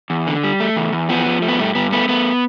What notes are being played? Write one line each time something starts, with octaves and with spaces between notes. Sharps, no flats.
E2
D3
G3
A3
E2
E2
F3 B3
F3
A3
B3
G2 A3
G2 B3
A3 B3
A3 B3